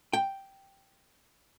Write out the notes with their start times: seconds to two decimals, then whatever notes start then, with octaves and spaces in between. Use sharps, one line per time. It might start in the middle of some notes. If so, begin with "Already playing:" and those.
0.13 G5